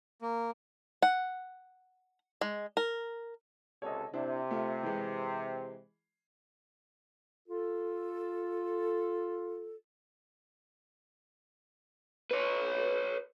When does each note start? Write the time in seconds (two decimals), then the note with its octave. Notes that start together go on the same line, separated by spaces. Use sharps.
0.22 A#3
1.02 F#5
2.41 G#3
2.77 A#4
3.82 C#2 C3 A4 C#5 D#5
4.14 C3 D4 E4 C5
4.51 A3 F4
4.83 E3 G#3
7.47 F4 A4
12.31 B4 C#5